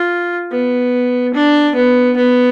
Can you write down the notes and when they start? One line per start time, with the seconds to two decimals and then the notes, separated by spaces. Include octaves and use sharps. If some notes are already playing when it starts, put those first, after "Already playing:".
Already playing: F4
0.52 B3
1.34 D4
1.75 B3
2.17 B3